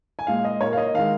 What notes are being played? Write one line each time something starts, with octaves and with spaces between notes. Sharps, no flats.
G#5
A#2 G#3 F5
D#5
A#2 A#3 C#5
F5
D#5
D#3 G#3 F5